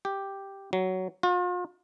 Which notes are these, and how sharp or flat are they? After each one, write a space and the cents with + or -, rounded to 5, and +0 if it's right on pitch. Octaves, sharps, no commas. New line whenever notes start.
G4 +0
F#3 +10
F4 +40